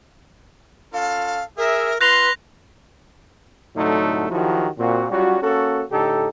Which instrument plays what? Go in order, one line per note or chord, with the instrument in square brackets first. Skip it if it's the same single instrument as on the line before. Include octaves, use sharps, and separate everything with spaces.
[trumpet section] C#4 F4 A4 [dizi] F5
[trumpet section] G#4 E5 [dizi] A#4
[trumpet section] F4 C6 [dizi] B4 [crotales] F#6 A#6 F7
[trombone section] C2 A2 D3 F#3 A3 D#4
D#3 F3 F#3 E4 F#4 G4
A#2 C4 F#4
F#3 G3 C#4 F4 F#4
A#3 C#4 F#4 A4
A2 D3 D#4 G4 A4